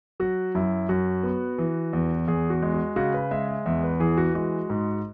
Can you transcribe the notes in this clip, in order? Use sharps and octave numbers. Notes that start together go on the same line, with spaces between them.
F#3 F#4
F#2 E4
F#2 F#4
B3
E3
E2
E2 G#4
F#4
G#3
F#4
C#3 F#4
B4
G#3 E5
E5
E2 E5
B4
E3 G#4
F#4
G#3 F#4
G#2